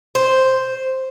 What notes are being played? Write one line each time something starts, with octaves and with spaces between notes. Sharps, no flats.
C5